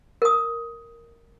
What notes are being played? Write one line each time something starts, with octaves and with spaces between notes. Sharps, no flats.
A#4 D#6